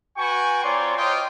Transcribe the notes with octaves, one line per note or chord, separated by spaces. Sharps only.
F#4 B4 G5 G#5 C#6
C4 F4 C#5 D5 A#5 C6
F4 C5 C#5 D#5 G5